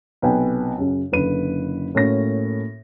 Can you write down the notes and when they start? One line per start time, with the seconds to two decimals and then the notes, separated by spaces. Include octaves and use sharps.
0.22 B1 C3 B4 G5 G#5
0.78 F#2 C#3
1.12 F#1 D3 B4 D#7
1.95 A2 A#3 C#4 F#4 A#6